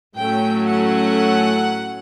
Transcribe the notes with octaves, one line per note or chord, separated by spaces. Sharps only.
A2 F#3 A3 C#4 G5
F#5